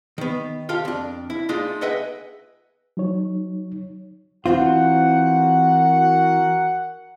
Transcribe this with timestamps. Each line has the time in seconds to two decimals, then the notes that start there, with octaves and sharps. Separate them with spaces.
0.18 D#3 B3
0.69 F4 G4 A4 F5
0.85 F2 D4
1.30 E4
1.49 G#3 A3 D4 D#4 F4
1.82 G#4 B4 D#5 E5 F#5 G5
2.97 F#3 D#4 C#5
4.46 E3 C4 F4 F#4 A#4 F#5